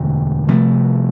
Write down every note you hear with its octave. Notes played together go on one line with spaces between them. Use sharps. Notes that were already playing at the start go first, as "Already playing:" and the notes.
Already playing: E1 D2 D3 G#3
C2 C3 F3 A3